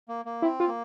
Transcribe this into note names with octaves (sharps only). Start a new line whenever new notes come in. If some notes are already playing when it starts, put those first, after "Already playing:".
A#3
A#3
C4 E4
F4
A#3